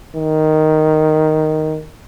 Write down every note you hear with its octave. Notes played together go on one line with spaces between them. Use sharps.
D#3